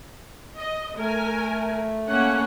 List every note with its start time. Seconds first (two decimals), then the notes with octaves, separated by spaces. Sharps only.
0.57 D#5
0.97 A3 A#4 G#5
2.09 A#3 C#4 F#5